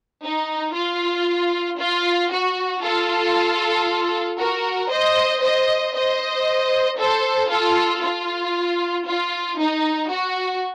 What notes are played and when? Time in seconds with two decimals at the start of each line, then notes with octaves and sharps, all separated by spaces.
0.24 D#4
0.75 F4
1.79 F4
2.31 F#4
2.83 F4 A4
4.39 F#4 A#4
4.91 C5 D#5
5.43 C5 D#5
5.95 C5 D#5
6.99 A4 C5
7.50 F4 A4
8.03 F4
9.07 F4
9.59 D#4
10.11 F#4